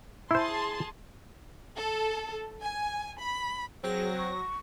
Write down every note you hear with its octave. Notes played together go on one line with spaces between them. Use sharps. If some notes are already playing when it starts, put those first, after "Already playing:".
E4 G#4 C5 A5 C6
A4
G#5
B5
F#3 C4 G#4 A#6
C#6